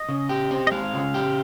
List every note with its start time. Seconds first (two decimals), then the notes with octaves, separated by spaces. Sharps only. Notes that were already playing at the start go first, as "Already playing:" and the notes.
Already playing: D#5
0.09 C#3
0.29 G4
0.51 C4
0.67 D#5
0.71 G#3 F5
0.94 C#3
1.14 G4